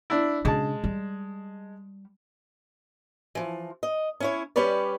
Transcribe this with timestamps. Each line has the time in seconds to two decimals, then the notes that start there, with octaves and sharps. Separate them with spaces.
0.10 D4 E4
0.45 C#3 G#3 D4 A5
0.84 G3
3.35 E3 F3
3.83 D#5
4.20 C#4 E4 C#5
4.56 G3 C#4 G4 B4 C#5 D5